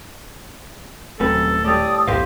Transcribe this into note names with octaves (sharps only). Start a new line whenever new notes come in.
D#1 F#2 C3 A3 A4 B4
A2 G3 D5 A5 D#6 E6
B1 E2 A2 G4 B4 C5 F5